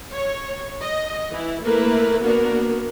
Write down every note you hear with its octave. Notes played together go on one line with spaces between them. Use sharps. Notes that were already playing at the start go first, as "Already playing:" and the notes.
C#5
D#5
E3 E4
A3 A#3 E4 A#4 B4
A#3 B3 D4 F#4 A#4